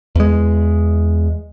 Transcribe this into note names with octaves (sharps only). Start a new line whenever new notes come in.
E2 G#3